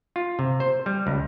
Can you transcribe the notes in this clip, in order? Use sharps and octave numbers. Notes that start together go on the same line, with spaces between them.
F4
C3
C5
G3
C#2